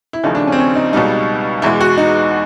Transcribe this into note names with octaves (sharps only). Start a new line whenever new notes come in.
E4
D#2 C#3 F3 A3 D#4
D4
C#4
C4
C#4
D#4
C#2 B2 G3 D#4
E2 B2 G#3 E4
F#4
D#4